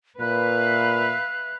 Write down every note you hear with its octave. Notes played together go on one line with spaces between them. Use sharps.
A#2 B4 E5 F5 F#6